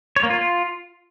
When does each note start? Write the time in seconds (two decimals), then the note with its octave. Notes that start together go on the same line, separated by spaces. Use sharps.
0.16 C#5
0.23 A#3
0.30 F4